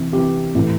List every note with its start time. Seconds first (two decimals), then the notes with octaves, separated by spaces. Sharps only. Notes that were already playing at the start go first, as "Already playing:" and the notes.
Already playing: C3 E3
0.12 C3 E3 G4
0.55 A2 E3